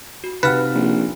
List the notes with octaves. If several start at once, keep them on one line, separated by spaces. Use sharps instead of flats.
F#4
C3 D#4 B4 F5 F#5 F6
A#1